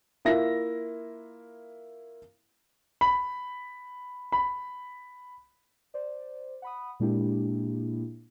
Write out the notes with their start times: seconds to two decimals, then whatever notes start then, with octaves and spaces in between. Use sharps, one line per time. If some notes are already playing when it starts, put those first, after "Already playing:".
0.25 A#3 E4 F4 E5 A#6
3.01 B5
4.32 B5
5.94 C5 D5
6.62 F#5 B5 D#6
7.00 A#2 G#3 A#3 D4 E4 G4